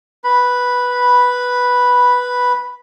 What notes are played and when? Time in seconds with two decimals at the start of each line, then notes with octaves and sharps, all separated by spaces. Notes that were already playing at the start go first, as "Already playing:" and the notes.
0.24 B4 B5